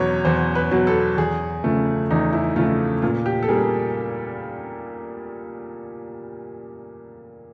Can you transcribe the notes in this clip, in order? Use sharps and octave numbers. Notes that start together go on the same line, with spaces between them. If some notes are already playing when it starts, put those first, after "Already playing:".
Already playing: E2 B2 F#3 B3 C#5
E2 C5
B4
B2 F#3 B3
A4
E2 G#4
C#3 F3 A3
E2 D#4
E4
C#3 F3 A3 F4
A#2 F4
G4
A4
G3 A#3 G#4